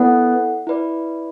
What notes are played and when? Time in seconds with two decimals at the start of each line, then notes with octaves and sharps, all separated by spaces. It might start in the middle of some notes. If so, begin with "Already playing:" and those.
Already playing: B3 E4 A4 D5 F#5
0.67 E4 B4 D5